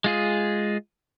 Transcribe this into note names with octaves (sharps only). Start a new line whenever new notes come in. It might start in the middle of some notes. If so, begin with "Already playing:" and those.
G#3 F4 G#4